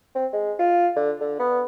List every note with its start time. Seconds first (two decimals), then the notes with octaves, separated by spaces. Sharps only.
0.15 C4
0.32 G#3
0.59 F4
0.96 D3
1.20 D3
1.39 B3